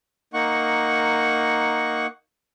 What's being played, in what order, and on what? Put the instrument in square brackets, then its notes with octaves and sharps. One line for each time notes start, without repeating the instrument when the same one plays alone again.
[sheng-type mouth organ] A#3 D#4 F#5 C#6